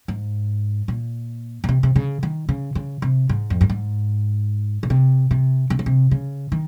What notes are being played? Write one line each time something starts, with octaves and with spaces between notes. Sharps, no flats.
G#2
A#2
A#2
C3
C3
C#3
D#3
C#3
C#3
C3
G#2
F2
G2
G#2
A#2
C3
C3
C3
C#3
C3
C#3
D#3